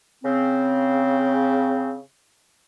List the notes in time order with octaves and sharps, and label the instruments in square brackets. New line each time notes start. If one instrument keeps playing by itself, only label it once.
[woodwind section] C#3 C4